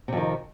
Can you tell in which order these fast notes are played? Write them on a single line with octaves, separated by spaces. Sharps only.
C3 F2 D#3